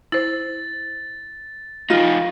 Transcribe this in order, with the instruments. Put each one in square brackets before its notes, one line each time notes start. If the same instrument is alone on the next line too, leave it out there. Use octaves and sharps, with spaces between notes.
[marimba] E4 C5 [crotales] A6
[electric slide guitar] F3 D#4 [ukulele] F4